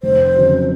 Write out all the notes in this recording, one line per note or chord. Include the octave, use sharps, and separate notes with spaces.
F1 C5
F2 C#3 F#3